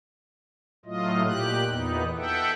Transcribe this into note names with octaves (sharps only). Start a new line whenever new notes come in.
A2 F#3 A3 F4 D#5
A#2 G4 F#6
E2 A#2 B3 D#4
A4 E5 F#5 G5